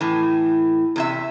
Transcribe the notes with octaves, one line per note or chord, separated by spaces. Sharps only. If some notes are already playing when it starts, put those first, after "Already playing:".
A2 E3
E2 C3 E5